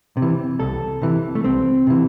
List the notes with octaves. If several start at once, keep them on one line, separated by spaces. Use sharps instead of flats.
C3
E3
C2 A4
C3 E3
A3
C2 C4
C3 E3